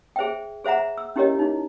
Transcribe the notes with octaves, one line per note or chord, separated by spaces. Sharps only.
G#4 C5 E5 G5
G#4 C5 E5 F#5 A#5
E6
C#4 E4 G4 A#4 C#5 D#5
D#4 E4